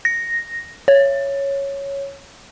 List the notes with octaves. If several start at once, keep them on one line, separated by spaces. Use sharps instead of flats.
A#6
C#5